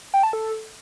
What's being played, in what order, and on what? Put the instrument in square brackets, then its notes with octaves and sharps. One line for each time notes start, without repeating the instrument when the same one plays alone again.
[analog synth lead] G5
A5
A4